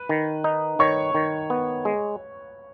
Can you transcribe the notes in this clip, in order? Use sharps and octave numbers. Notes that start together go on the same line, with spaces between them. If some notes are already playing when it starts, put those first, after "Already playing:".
Already playing: B4
D#3
D#4
D#3 C#5 C#6
D#3
B3
G#3